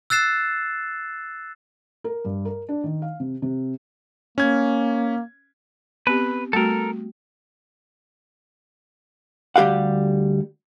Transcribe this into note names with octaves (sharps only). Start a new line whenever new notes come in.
E6 F#6 A6 C7 E7
A#4
G2
A#4
D4
D#3
F5
C3
C3
A#3 C#4 G#6
B3 C4 G4 B4
G3 A3 F#4 A4 A#4
D2 G3 G4 F5 F#5